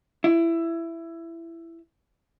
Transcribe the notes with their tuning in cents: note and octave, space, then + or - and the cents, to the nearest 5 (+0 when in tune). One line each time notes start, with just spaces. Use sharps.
E4 +15